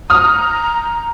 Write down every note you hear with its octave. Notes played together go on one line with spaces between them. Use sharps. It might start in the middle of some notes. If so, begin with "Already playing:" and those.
A#5 D#6 F6